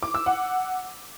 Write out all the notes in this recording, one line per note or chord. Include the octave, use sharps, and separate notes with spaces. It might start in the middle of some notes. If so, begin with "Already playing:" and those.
D6
E6
F#5